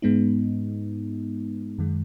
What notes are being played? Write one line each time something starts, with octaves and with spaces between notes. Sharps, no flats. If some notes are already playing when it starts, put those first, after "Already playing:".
G#2 G#3 B3 D#4
F#2 D#3 G#3